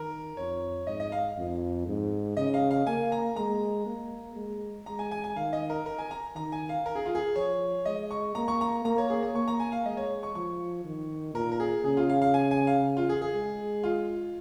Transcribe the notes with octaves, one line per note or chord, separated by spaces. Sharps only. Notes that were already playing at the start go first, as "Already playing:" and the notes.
Already playing: D#3 A#4
F2 C#5
G#2 D#5
D#5
F5
F2
G#2
C#3 D#5
F5
F5
A#3 G#5
A#5
G#3 A#5
A#3
G#3
G#3 A#5
G#5
G#5
G#5
D#3 F5
D#5
A#4
A#4
G#5
A#5
D#3 A#5
G#5
F5
A#4
G#4
F4
G#4
F3 C#5
G#3 D#5
C#6
A#3 A#5
C#6
A#5
A#3 A#5
C#5
G#4
C#5
A#3 C#6
A#5
G#5
F5
G#3 D#5
C#5
C#6
F3 C#6
D#3
A#2 A#4
A#4
G#4
C#3 G#4
F4
F5
F5
G#5
G#5
F5
F4
G#4
G#4
G#3
F4